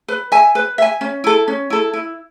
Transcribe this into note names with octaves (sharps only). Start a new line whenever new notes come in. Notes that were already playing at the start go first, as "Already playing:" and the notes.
B4
E5 G#5
B4
E5 G#5
C#4
E4 A4
C#4
E4 A4
E4